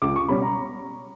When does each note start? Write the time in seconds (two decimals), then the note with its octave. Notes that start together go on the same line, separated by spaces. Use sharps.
0.02 C#2 D6
0.16 C#6
0.28 B2 G3 C#4 B5
0.42 A#5